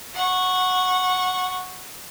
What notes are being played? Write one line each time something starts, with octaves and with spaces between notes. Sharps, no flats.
F#5 C#6